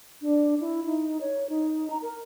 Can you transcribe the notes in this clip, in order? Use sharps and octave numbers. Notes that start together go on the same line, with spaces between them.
D4
E4
D#4
C#5
D#4
A#5
A#4